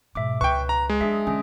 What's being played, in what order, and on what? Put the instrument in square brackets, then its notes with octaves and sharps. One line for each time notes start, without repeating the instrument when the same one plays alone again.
[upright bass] G#2 B2 [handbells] E5 D6
[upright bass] C#2 [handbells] B4 [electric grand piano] G5 C#6
[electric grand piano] A#5
G#3
[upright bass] F#3 [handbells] D4 G#4 E5
[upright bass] D3 [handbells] C#4 G#4